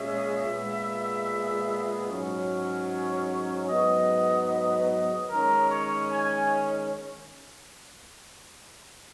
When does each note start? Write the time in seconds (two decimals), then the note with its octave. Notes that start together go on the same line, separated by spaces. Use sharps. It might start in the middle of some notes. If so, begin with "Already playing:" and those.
Already playing: A#2 G#3 C#4 E5
0.47 A#2 G#3 B3
2.08 G#2 F#3 C#4
3.69 G#2 F#3 B3 D#5
4.48 D#5
5.29 D#3 G#3 C#4 A#4
5.69 C#5
6.10 G#5